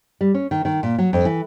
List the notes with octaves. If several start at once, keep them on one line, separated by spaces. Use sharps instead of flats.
G3
C#4
D#3
D#3
A#2
F#3
F2
E3